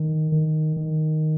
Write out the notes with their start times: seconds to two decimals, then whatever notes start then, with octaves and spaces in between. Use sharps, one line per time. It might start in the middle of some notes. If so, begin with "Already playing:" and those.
Already playing: D#3
0.32 D#3
0.77 D#3